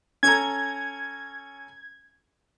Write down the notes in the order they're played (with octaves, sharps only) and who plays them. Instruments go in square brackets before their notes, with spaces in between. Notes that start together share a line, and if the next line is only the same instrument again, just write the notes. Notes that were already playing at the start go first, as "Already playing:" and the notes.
[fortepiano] C#4 A4 A#5 [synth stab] G#6